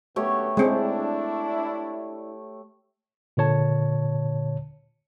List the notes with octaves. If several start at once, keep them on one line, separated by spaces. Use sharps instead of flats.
F#2 D3 A3 B3 G4 C#5
G#3 C4 D4 E4
A#2 D3 C#5 A5